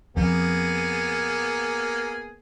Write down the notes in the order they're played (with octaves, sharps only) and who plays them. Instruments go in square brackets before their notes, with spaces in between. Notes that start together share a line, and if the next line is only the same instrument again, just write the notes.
[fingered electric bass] F2 [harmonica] A#3 B3 G#4